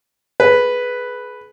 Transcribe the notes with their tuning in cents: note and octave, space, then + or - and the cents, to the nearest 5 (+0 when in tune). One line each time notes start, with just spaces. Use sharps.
G#4 +30 B4 +0